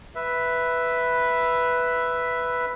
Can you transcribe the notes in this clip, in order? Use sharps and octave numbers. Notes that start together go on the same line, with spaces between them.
B4 E5